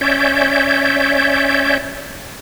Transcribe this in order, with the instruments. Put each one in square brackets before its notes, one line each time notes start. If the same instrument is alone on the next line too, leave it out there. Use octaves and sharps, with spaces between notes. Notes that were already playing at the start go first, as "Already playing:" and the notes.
[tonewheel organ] C#4 C#5 D5 E5 G6